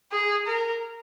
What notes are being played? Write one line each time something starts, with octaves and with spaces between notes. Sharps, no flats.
G#4
A#4